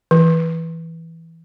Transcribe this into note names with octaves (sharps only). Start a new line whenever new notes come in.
E3